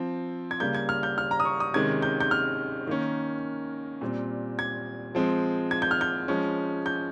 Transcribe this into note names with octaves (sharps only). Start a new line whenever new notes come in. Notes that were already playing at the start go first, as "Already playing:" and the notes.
Already playing: F3 C4
G#6
C#3 G3 A#3 G6
G#6
F6
G6
F6
A#5
D#6
C#6
D#6
C3 D#3 G#3 C#4 G#6
G6
G6
F6
D#3 A#3 C#4
A#2 G3 C4
G#6
F3 G#3 C4
G#6
G6
F6
G6
F3 G#3 C#4
G6